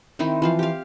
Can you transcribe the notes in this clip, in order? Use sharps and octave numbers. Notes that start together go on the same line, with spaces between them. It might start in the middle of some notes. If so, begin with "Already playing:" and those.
D#3 C4 D#4 E4
E3 F3 F5
G4 F5